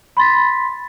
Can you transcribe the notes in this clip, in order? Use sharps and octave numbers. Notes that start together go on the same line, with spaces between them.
B5 C6 A6 B6